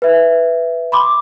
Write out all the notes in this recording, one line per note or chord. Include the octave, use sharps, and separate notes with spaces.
B4 E5
B5 C6 D6